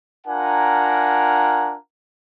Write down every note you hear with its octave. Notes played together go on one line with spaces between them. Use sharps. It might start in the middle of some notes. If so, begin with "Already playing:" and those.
D4 F4 A#4 F#5 G#5 A#5